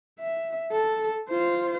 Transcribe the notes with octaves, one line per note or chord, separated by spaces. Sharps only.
E5
A4
F4 C5